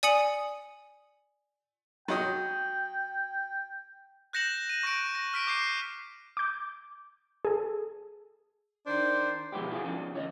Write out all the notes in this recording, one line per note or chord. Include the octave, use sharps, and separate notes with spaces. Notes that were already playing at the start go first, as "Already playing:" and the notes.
D5 G#5 D#6 C#7 F#7
F#3 D#5 G5 D#6
F#6 G6 A#6 C#7 E7 F#7
D#7
C#6 F#6 A#6 D7
A#6
F6 B6 D7
D6 G6 C7 D#7
D6 G6
G#4 A4
D#3 D4 C5
B2 F3 G#3 B3 E4 G4
E4 F#4 G#4 A4 F5
F3 C#4 D4 F4
D2 C#5 D#5